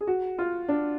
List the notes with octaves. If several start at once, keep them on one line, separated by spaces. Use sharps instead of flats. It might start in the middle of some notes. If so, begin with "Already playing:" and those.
G#4
F#4
F4
D4